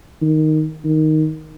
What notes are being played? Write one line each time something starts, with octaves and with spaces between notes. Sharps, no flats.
D#3
D#3